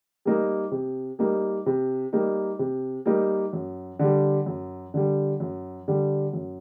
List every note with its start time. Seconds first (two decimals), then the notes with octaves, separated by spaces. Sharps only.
0.25 G3 A#3 D#4
0.71 C3
1.19 G3 A#3 D#4
1.66 C3
2.13 G3 A#3 D#4
2.59 C3
3.06 G3 A#3 D#4
3.53 F#2
3.99 D3 G3
4.46 F#2
4.94 D3 G3
5.40 F#2
5.88 D3 G3
6.33 F#2